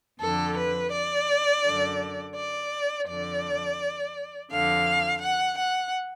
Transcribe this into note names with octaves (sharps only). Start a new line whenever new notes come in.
F2 D3 A4
B4
D5
F#2 D3
D5
F2 D3 D5
F2 D3 F5
F#5
F#5